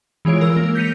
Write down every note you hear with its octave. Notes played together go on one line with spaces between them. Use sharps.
E3 G#3 F4 C#5 D7
A#4 E6
A#3
G6 A#6 B6 C#7 D#7 F7